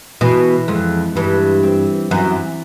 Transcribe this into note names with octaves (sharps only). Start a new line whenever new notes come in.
B2 E3
F2 G#3
G2 E3
C4
F#2 E3